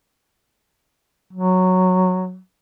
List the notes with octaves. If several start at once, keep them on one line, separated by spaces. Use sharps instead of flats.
F#3